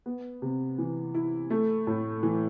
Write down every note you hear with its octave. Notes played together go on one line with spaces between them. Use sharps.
B3
C3
E3
E4
A3
A2
E3